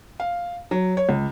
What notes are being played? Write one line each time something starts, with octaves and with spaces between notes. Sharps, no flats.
F5
F#3
C#5
C#2